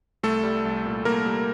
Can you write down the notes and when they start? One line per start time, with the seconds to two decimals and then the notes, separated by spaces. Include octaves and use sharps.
0.23 C2 A3 A4
0.44 G3
0.65 C2
0.86 A#2
1.05 C2 A#3 A#4
1.26 G3